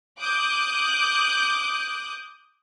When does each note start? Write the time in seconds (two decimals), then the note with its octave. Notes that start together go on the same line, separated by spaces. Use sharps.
0.20 D6 D#6 F#6 G6